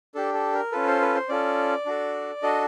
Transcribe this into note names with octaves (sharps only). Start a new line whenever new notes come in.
D4 G4 A4
A4
A#4
C#4 F4 A4 B4
C5
B4
C5
C#4 F4 A4 D5
D4 F#4 A4
D4 F#4 A4 D#5